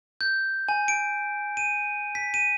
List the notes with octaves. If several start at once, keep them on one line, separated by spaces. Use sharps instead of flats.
G6
G#5
D7
D#7
B6
D#7